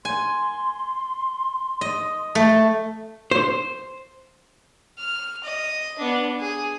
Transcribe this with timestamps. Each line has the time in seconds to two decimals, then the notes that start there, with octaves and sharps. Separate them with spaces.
0.05 G#5 C6
1.81 D#5
2.35 A3 A5
3.31 C5
4.98 F6
5.43 D#5
5.98 B3 D4
6.40 G#4